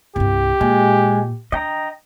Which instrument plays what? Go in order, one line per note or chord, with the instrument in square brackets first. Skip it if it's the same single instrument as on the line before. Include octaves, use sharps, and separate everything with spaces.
[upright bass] C2 G2 [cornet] G4
[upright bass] A#2 [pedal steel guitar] G#3
[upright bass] D4 [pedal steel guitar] D#5 G5 A#5